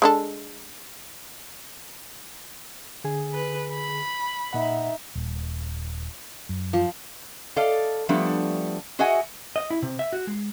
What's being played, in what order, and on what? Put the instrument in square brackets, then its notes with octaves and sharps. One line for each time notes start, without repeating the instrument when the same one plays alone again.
[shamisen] G#3 D4 A4
[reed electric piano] D3 G#4 G#5
[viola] B4
B5
[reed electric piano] A#2 F#5 [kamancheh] D#4 E5
[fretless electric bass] D#1
F#2
[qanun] F3
[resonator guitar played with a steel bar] A4 D5 D#5 F5
F3 G3 A3 B3 D4
F#4 G#4 D#5 E5 F#5 G#5
[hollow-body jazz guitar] D#5
E4
C3
E5
F#4
G#3